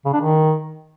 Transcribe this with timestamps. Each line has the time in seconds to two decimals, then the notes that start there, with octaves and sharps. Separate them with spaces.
0.06 C#3
0.13 D4
0.21 D#3